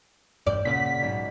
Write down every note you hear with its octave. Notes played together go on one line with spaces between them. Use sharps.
E1 G2 D5 E6 F#6 G6
A#2 C#3 F#5 F#6 G6 B6
B1 G#2 B2